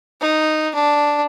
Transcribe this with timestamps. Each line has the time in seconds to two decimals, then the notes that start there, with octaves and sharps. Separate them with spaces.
0.21 D#4
0.75 D4